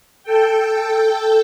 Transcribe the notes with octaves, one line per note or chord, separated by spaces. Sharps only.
A4 G5